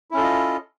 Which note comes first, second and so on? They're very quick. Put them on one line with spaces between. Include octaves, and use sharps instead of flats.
E4 C#4 A4 F4 D#5